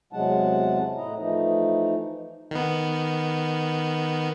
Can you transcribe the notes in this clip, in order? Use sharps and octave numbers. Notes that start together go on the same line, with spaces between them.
E2 C3 F#3 G#3 F#5 A5
A2 E4 D#5 A#5
E3 F3 A3 D#4
D#3 B3